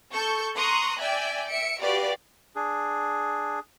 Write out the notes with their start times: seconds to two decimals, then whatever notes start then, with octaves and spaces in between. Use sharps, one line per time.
0.13 A4 C#6 G6
0.56 A#5 C6 C#6 D#6 F#6
1.00 D5 E5 G5 G#5
1.47 E5 C#7 D7
1.82 F#4 G4 B4 D5 F5
2.56 D4 G#4